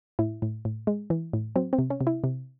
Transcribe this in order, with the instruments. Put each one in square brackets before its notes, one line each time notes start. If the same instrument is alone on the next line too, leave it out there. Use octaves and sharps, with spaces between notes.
[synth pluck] A2 E4
A2
A2
G#3
E3
A2
F#3 C4
C4
C3
C#4
C3
E4
C3